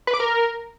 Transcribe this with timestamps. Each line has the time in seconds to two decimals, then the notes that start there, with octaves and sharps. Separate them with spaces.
0.07 B4
0.14 D6
0.20 A#4